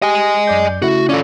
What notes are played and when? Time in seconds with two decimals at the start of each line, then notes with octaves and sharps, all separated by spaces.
0.02 G4 D#5 G#5
0.47 F#2 D5 G6
0.82 C#3 A3 E4 F#4
1.09 C#4 F4 A4 D5